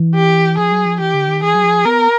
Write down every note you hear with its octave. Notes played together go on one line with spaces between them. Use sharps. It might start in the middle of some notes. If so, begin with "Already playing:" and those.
Already playing: E3
G4
F3 G#4
F#3
F3
E3 G4
D3
D#3
E3 G#4
F#3
F3
B3 A#4